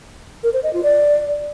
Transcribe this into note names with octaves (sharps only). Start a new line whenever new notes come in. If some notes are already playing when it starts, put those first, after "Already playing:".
A#4
C5
D#5
F4
D5